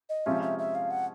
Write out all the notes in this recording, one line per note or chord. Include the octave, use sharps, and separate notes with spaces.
D#5
C3 F3 G#3 C#4 F4 E5
E5
E5
F5
F#5